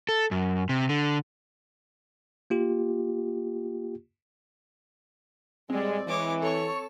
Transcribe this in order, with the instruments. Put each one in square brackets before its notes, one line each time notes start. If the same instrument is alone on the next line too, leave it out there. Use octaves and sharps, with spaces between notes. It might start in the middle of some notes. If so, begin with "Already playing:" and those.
[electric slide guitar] A4
F#2
C3
D3
[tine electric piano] A#3 F4 G4
[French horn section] A2 G#3 [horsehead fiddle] G3 D5 [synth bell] C4
[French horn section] E3 [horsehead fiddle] G#3 [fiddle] C#5 D6
[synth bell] A4 C#6 [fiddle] C#5 [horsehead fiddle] A5